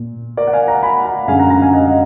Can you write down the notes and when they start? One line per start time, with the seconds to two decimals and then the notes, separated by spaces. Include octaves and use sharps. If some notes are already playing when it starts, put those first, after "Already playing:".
Already playing: A#2
0.37 A#4 D5
0.47 F#5
0.53 F5 G#5
0.68 F#5 A#5
0.82 G#5 B5
1.05 F#5 A#5
1.28 F#2 D3 G#3 F5 G#5
1.39 F#5 A#5
1.50 F#5 A#5
1.62 F5 G#5
1.73 D#5 F#5
1.87 D#5